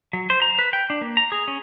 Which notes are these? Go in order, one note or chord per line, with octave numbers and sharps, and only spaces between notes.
F#3
C5
A#5
B4
G5
D4
A#3
A#5
G#4
C#4